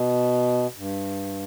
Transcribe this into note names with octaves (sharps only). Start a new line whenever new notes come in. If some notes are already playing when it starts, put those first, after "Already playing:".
Already playing: B2
G2